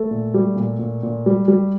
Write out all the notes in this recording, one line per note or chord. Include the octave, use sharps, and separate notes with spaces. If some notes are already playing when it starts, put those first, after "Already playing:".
Already playing: A3 A4
A#2
G3
A#2
A#2
A#2
G3
G3